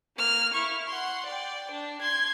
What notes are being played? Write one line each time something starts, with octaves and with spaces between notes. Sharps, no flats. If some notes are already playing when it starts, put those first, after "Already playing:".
A#3 F6
E4 C#6
F#5 C6
D5 G5
D4
C6 G#6